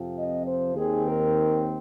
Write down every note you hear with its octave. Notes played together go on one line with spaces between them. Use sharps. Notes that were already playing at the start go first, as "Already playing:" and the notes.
Already playing: F2 C3 F3 C4
D#5
C5
D#2 D#3 C4 G#4
A#4